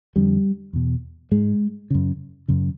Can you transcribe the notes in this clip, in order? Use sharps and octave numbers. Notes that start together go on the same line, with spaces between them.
F2 D3 G3
E2 B2
G#2 G#3
F#2 C#3
F#2 C#3